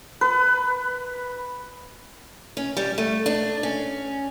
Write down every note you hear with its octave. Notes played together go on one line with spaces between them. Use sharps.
B4
C#4
G3
A3
D4
C#4